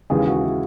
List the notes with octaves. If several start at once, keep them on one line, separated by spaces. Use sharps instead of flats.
D#2 C#3 E3 G#3 G#4
F#4
E4